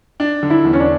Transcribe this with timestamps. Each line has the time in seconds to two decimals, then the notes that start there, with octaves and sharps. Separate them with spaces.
0.20 D4
0.43 D3
0.50 E4
0.65 E2
0.73 C#4
0.80 D4